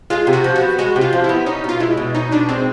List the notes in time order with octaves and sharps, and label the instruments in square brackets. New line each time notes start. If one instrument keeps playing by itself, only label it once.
[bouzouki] G#3 [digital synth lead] F4
[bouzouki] C3
[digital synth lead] F#4
[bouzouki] F3
[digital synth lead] F#4
[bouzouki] B3
[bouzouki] G#3 [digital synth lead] F#4
[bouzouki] C3
[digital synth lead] F4
[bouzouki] F3
[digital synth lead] E4
[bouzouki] B3
[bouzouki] C#4 [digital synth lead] D#4
[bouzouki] B2 [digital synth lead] F4
[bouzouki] G#3 [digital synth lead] E4
[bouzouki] B2
[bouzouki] C#4 [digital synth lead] D#4
[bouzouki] B2 [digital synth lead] D4
[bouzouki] G#3 [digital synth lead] C4